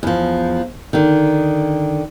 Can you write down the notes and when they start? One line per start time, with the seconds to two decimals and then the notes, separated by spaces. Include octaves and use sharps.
0.03 E2 F3
0.93 D3 D#3